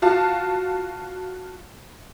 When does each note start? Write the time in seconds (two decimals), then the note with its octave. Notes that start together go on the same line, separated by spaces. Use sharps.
0.02 F4 F#4 F5 A5